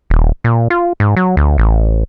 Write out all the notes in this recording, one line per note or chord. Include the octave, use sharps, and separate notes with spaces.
D#1
A#2
F4
G#2
F#3
D2
A1